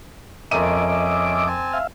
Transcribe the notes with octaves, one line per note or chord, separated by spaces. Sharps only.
F2 C#4 A#4 D#5 E5 D6 D#7
C4 G#5 A5
E5 F5